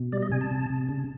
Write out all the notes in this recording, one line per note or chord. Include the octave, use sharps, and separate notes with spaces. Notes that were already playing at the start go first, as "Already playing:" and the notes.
Already playing: B2
G3 D5
D#5
C3 G#5
A5
C3
C3
C#3